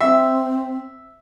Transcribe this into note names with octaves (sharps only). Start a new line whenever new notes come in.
C4 E5